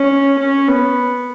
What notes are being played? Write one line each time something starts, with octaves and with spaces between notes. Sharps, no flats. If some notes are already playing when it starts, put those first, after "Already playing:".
Already playing: C#4
C#4
B3